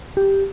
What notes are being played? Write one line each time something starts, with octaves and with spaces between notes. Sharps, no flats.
G4